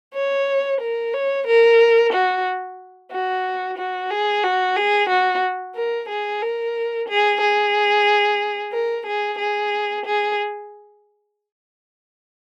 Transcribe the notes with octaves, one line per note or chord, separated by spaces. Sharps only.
C#5
A#4
C#5
A#4
F#4
F#4
F#4
G#4
F#4
G#4
F#4
A#4
G#4
A#4
G#4
G#4
A#4
G#4
G#4
G#4